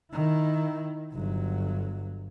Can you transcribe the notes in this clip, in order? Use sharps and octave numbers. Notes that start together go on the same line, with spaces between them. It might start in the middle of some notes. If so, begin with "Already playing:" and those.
D#3 E4
G1 F#3